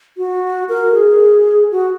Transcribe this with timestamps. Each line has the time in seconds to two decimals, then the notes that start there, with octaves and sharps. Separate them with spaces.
0.17 F#4
0.69 A#4
0.94 G#4
1.72 F#4